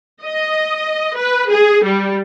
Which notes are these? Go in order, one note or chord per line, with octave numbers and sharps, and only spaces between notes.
D#5
B4
G#4
G3